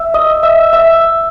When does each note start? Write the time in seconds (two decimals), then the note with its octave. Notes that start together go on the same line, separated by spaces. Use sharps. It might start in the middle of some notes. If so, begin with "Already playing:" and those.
Already playing: E5 E6
0.14 D#5 D#6
0.43 E5 E6
0.73 E5 E6